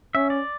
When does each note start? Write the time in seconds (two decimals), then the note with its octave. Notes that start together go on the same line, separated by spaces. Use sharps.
0.15 C#4 E5
0.30 D5